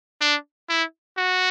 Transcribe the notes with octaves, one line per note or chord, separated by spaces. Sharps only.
D4
E4
F#4